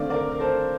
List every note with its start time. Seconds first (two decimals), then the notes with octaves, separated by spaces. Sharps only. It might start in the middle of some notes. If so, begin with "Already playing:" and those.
Already playing: D3 A3 C4 D5 F5
0.10 A#4 D5
0.32 A#4
0.40 A4 C5